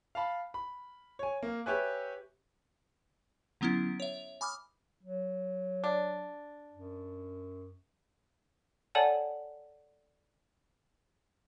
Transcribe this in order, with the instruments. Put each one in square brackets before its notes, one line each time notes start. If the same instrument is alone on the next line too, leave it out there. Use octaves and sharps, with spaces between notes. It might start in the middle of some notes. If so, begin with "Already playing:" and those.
[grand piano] F5 A5 B5
B5
C#5 G#5
A#3
G4 B4 C#5 E5 G#5 F#6
[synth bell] D3 F#3 B3 C#4 E4
C#5 E5
G#5 B5 D6 D#6 F6
[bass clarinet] F#3
[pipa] D4
[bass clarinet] F#2
[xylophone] A4 C#5 D5 F#5 G#5 A5